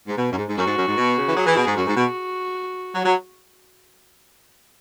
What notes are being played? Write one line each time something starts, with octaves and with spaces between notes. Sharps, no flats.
G#2
B2
F#2
G#2
G#2
F#2 F#4
G#2
F#2
G#2
B2
C#3
E3
F#3 G#4
E3
B2
G#2
F#2 F#4
G#2
B2
F#3
F#3